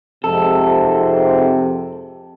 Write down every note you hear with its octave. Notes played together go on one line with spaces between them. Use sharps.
F2 G#2 C3 A4